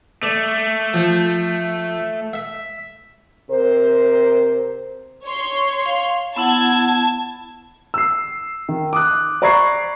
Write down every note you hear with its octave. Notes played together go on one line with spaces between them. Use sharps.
A3 D5
F3
E5
C3 A#4 C5
C#5 C6
F5
B3 E4 F#5 A5 G#6
E6 C7
D#3
D6 D#6 F#6
D5 A#5 B5 C#6 G#6 C7